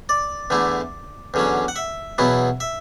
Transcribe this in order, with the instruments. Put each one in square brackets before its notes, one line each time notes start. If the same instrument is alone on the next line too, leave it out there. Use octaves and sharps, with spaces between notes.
[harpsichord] D5
E2 D3 A3 E4
E2 D3 F#3 C#4
F#5
E5
E2 B2 F#3 B3 E4
E5